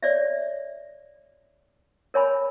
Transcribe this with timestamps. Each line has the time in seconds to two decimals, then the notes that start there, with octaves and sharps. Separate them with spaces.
0.02 C#5 D5 E5
2.14 A#4 C#5 G#5 B5